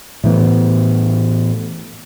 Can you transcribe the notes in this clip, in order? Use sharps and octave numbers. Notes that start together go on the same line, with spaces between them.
A2 E3 B3